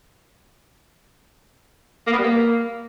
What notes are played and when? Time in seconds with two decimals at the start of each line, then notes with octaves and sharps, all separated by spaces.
2.07 A#3
2.12 B3
2.18 G3
2.24 A#3